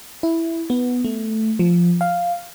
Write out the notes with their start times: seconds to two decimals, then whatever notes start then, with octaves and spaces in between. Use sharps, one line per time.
0.23 E4
0.70 B3
1.04 A3
1.59 F3
2.01 F5